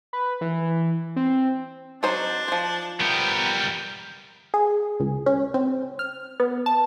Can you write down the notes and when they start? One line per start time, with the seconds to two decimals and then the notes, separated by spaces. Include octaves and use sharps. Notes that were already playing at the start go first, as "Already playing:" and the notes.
0.13 B4
0.41 E3
1.16 C4
2.03 F#3 D4 D#4 C5
2.48 F3 C5
3.00 G3 B3 A#4 G5
4.54 G#4
5.00 C#2
5.26 C#4
5.54 C4
5.99 F6
6.40 B3
6.66 A5